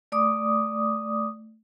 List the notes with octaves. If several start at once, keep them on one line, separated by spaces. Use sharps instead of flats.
A3 D5 D6 D#6